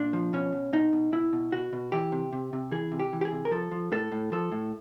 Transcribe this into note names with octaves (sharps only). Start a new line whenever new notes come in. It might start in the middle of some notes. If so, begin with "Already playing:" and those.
Already playing: A#2 D4
F3
B2 C#4
B2
B2 D#4
B2
B2 E4
B2
B2 F#4
B2
E3 G4
C3
C3
C3
E3 G#4
C3
G4
E3
G4
G#4
C3
A#4
F3 A4
F3
A2 A4
A2
F3 A4
A2